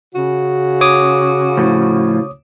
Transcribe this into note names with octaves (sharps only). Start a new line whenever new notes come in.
C#3 F#4
C#5 D6 D#6
A2 F3